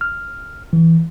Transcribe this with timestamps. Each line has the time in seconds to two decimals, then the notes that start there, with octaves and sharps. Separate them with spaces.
0.01 F6
0.73 E3